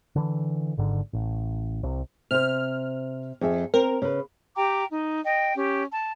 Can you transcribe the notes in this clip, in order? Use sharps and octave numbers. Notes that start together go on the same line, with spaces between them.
D3 E3
G#1 G#2 D3
A1
C2 C3
C3 C5 F6
F2 G#4 E5
C4 A#4
C#3 B4
G4 G5 A#5 D6
D#4
D#5 G5
C#4 G4
A5